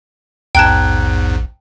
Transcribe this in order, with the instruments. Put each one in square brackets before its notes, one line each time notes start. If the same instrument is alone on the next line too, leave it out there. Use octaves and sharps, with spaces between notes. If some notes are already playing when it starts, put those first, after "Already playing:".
[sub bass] A#1 [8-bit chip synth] E2 G#2 [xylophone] G5 A5 [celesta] A#5 F#6 G#6